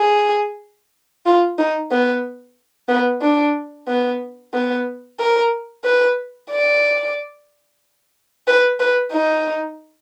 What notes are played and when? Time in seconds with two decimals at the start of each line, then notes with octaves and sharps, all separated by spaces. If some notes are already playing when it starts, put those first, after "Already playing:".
Already playing: G#4
1.26 F4
1.58 D#4
1.91 B3
2.88 B3
3.22 D4
3.87 B3
4.54 B3
5.19 A#4
5.84 B4
6.50 D5
8.47 B4
8.80 B4
9.12 D#4